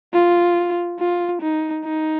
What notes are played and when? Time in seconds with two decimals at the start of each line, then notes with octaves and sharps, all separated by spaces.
0.14 F4
1.00 F4
1.42 D#4
1.84 D#4